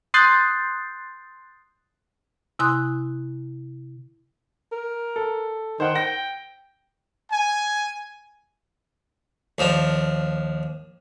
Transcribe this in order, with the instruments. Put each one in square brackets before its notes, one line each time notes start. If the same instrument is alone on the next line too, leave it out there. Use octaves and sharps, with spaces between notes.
[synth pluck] C6 D#6 F#6 G6 A6 C7
[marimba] C3 E4 G#5 C6 D#6 F#6
[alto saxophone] A#4
[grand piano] A4
[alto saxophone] D#3 [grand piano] C5 F#5 G5
[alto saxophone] G5 [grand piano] A#6
[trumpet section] G#5
[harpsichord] D#2 F3 D4